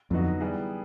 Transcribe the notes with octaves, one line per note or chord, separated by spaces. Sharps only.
F2 D3 F#3 B3 D#4 F#4
E3 G3 B3 E4 G#4